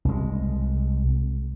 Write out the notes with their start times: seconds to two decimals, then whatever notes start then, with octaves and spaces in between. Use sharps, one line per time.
0.05 C2 G#3